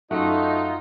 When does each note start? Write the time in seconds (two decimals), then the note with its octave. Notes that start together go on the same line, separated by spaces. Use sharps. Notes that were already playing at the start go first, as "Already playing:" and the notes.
0.11 F#2 A3 D#4 F4 F#4 F#5